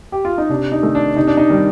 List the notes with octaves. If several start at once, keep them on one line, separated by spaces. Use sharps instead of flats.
G4
F4
D#4
C3 D4
D#4
D#3 A3
D4
C3 D#4
D4
D#4
D#3 G3